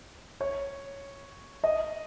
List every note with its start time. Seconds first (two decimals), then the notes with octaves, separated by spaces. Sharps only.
0.41 C#5
1.64 D#5